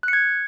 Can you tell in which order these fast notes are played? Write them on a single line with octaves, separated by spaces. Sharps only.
F#6 C#7 G#6